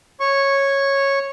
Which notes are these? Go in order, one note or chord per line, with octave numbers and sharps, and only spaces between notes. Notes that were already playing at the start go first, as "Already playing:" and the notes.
C#5 C#6